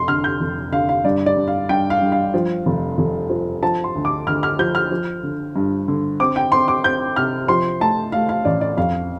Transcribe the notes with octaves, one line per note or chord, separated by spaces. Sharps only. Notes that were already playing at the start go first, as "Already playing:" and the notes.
Already playing: F1 C6
D3 F6
G6
F1
D3 F5
F5
G2 D5
D5
G2
F5
G2 G5
F5
G2
F5
F3
F1
F1
F3
F3 A5
C6
D2
D6
D2 F6
F6
F3 G6
F6
F3
D3
G2
D3
C4 D6
G5
C4 C6
D6
C4 G6
C3 F6
F3 C6
A3 A5
A3 F5
F5
A1 D5
D5
F2 F5